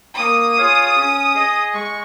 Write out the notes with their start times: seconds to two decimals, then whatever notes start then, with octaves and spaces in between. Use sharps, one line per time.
0.18 A#3 D#6
0.57 F4 G#4 C#5 F5
0.96 C#4
1.35 G#4 D#5
1.74 G#3 C#6